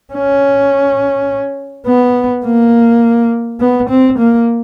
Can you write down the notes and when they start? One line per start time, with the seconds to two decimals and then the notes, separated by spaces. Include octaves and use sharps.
0.14 C#4
1.87 B3
2.45 A#3
3.60 B3
3.89 C4
4.18 A#3